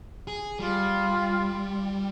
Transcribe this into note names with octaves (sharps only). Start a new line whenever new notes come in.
G#4
G3 F4